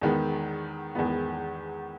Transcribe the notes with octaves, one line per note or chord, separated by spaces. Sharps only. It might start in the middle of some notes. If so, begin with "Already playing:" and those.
E2 D#3 G#3 B3
E2 D#3 G#3 B3